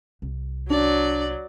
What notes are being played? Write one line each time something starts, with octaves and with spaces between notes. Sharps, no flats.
C2
F#3 D4 D5